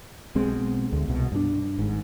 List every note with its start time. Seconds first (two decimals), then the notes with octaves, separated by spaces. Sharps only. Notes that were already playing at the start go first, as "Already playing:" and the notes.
0.35 B1 B2 G#3 C4
0.92 D2
1.08 C2 B2
1.32 G2 D4
1.78 G#1 G#2